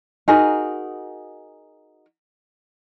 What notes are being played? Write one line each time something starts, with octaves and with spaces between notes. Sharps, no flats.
D#4 F#4 G#4 A#4